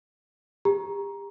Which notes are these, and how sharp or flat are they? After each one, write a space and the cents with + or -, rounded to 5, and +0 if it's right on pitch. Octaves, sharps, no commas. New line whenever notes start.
G4 +35 A#5 +15